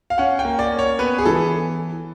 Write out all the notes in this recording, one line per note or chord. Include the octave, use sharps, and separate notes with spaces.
F5
C#4 F#5
G5
A#3
D5
C#4
C#5
B3 B4
G#4
E3 A4